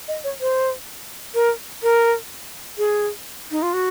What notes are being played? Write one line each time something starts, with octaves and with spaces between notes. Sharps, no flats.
D#5
C#5
C5
A#4
A#4
G#4
D#4
F4
F#4